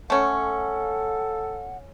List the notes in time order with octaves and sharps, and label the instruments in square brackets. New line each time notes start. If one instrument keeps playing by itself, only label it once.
[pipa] A3 C#4 [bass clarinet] A4 [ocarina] F#5